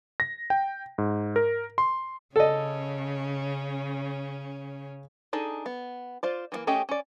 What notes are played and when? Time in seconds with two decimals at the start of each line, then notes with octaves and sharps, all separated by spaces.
0.20 A#6
0.50 G5
0.98 G#2
1.36 A#4
1.78 C6
2.36 C#3 C#4 A4 D#5
5.33 D4 D#4 G#4 A4
5.66 B3
6.23 F4 C5 D5
6.52 E3 G3 A#3
6.67 A3 C#4 G4 G#4 D#5
6.89 C#4 D5